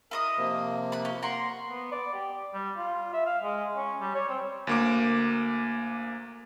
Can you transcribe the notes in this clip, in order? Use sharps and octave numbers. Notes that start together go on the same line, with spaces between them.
E4 A#4 D#5 D#6
C3 F3 A#3
B5 F#6
C#4
A#3 A#4 F#5 C6
B3
D5
G4
G3
F4
E5
F5
G#3
C#4
G3
C#5
C4
D2 A#3 D6